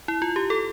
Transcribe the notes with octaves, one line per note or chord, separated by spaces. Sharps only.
E4
F4
G4
A4